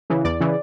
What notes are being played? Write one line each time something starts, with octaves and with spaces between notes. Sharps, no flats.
C#3 E3
E2 D5
C#3 E3